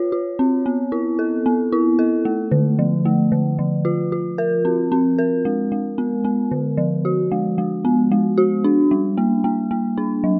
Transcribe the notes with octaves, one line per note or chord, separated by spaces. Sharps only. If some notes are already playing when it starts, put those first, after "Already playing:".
Already playing: F4 C#5
F4
C4
B3
E4
A4
B3
E4
A4
A3
D3
F3
A3
D3
F3
F4
F4
A#4
C4
C4
A#4
G#3
G#3
B3
B3
D3
F3
F#4
G#3
G#3
B3
G#3
F#4
D4
G3
A#3
A#3
A#3
D4
F#3